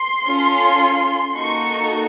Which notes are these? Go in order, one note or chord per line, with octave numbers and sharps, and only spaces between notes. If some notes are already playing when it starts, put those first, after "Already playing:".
Already playing: C6
C#4 F4 A4
A#3 D#4 F#4 A4 C#6